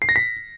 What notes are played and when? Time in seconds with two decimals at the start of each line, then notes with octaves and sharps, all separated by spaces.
0.02 C7
0.09 A#6
0.16 B6